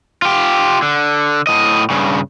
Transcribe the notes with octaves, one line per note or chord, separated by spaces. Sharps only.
F4 G4
D3
A2 D#5
G2 C#3